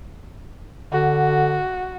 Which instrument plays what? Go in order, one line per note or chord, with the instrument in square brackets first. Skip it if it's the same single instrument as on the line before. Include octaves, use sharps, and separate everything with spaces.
[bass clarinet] D3 [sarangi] F#4